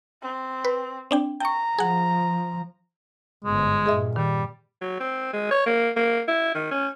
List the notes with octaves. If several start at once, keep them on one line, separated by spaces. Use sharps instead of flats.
C4
B4
C4 D4 G5
G5 A#5 C#6
F3 G#4 F#5
G1 G#2 G#3
G2 A#2 G#4 D#5 E5
D#3 G3
F#3
C4
G#3
C#5
A#3
A#3
E4
D#3
C#4